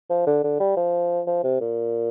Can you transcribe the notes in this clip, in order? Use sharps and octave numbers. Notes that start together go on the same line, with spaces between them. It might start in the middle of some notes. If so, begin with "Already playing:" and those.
F3
D3
D3
G3
F3
F3
C3
A#2